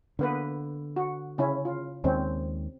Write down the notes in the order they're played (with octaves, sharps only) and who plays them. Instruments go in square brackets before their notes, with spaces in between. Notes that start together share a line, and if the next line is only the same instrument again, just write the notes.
[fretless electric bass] D3 [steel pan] A#3 B3 B4
[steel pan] F#4
C#3 C#4 E4
F4
[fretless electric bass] D#2 D#3 G#3 [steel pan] C4 C#4